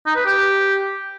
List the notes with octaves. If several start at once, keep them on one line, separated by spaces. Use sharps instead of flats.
D#4
B4
G4